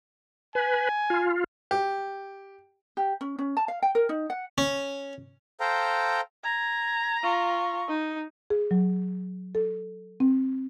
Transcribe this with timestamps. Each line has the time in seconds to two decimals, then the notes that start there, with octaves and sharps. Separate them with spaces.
0.55 B4 G#5
1.10 F4
1.71 G4
2.97 G4
3.21 C#4
3.39 C#4
3.57 A5
3.68 F5
3.82 G5
3.95 A#4
4.09 D#4
4.30 F#5
4.58 C#4
5.60 A4 C5 F5 G5 A#5
6.43 A#5 G#6
7.23 F4 C#6
7.88 D#4
8.50 G#4
8.71 F#3
9.55 A4
10.20 C4